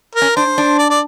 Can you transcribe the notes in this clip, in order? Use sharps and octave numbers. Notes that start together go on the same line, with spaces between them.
A#4
C#4
D4 C5
D4
D5
D5